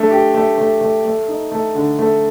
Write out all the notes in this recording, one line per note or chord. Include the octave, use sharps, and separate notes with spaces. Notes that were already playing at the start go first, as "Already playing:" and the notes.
Already playing: A3 D4
G4
A3
A3
A3
A3
D#4
A3
D3
A3